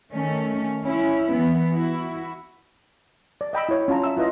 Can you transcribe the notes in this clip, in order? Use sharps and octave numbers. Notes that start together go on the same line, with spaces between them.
D#3 A3 C#4
C#4 E4
E3 B3
E4 F#4
D5
D#5 G5 B5 E6
E4 C#5
C#4 F4 A5 A#5
E5 E6
E4 F4 B4 D#5 E5